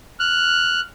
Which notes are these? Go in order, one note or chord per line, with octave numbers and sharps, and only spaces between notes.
F6 F#6